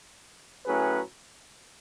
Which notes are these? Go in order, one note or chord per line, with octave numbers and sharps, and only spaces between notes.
A2 F#3 C#4 G#4 B4